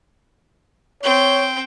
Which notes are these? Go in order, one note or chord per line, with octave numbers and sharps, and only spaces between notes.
C4 C#5 G5